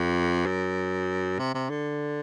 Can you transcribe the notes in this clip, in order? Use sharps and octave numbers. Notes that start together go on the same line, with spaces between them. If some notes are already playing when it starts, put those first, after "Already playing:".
Already playing: F2
F#2
C3
C3
D3